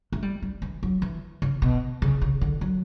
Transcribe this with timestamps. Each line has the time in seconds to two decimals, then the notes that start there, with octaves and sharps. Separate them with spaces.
0.12 A3
0.22 G3
0.42 G3
0.62 E3
0.83 F#3
1.02 E3
1.42 C#3
1.62 B2
2.02 C#3
2.21 C#3
2.41 D3
2.61 F#3